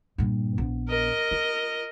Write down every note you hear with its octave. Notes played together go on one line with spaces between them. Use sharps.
G2 A#2
A#1 B3
A#4 D#5
F4